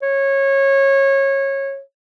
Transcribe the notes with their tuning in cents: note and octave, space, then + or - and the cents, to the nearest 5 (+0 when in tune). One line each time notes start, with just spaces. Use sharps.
C#5 -20